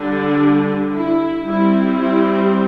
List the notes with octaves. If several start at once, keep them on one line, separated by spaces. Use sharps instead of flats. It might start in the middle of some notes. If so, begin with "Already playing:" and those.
Already playing: D3 G3 D4
E4
G3 C4 E4
E4